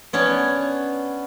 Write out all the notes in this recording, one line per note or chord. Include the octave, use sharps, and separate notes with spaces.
B3 C#4 D4 C#5